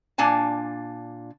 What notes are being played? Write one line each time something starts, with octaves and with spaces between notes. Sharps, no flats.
A#2 D4 G#5 A5